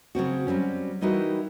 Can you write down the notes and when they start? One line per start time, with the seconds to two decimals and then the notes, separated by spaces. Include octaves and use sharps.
0.15 C#3 F#3 C4 F#4
0.47 F#3 G3 C4 C#4
1.01 E3 G3 D#4 E4 F#4 A#4